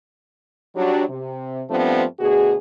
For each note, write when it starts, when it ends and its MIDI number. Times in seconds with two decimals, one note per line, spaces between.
0.76 1.03 54
0.76 1.03 55
0.76 1.03 62
1.09 1.62 48
1.69 2.03 43
1.69 2.03 53
1.69 2.03 57
1.69 2.03 59
1.69 2.03 60
1.69 2.03 62
2.19 2.55 38
2.19 2.55 47
2.19 2.55 66
2.19 2.55 68